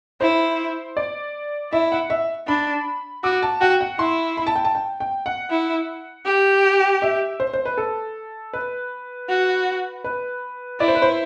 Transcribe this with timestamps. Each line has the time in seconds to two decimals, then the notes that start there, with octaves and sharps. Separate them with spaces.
0.21 E4 C5
0.97 D5
1.73 E4 E5
1.92 F#5
2.10 E5
2.47 D4 B5
3.24 F#4 D6
3.42 A5
3.61 F#4 G5
3.81 F#5
3.99 E4 C6
4.37 B5
4.47 A5
4.56 G5
4.65 A5
4.75 G5
5.00 G5
5.26 F#5
5.50 E4
6.26 G4
7.02 E5
7.40 C5
7.54 C5
7.65 B4
7.78 A4
8.53 B4
9.29 F#4
10.04 B4
10.80 E4 D5
10.88 C5
10.95 B4
11.02 C5